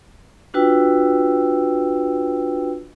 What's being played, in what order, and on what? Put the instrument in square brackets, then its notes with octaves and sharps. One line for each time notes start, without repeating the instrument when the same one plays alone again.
[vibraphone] D4 F4 F#4 B4 G5 E6